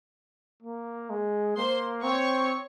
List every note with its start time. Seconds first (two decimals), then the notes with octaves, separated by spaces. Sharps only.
0.63 A#3
1.10 G#3
1.56 A#3 C5 C6
2.03 C4 C#5 C#6